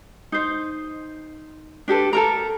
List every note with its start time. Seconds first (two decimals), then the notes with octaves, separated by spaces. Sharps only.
0.32 D#4 C5
1.88 D4 G4 A4 B4
2.13 A4 A#4 A#5